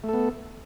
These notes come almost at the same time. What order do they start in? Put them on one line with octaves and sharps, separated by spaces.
A3 A4 B3